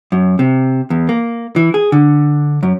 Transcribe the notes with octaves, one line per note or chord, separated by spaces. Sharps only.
F#2
C3
E2
A#3
E3
G#4
D3
F#2